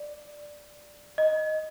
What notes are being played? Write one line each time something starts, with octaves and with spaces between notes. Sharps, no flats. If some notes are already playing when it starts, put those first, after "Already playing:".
Already playing: D5
D#5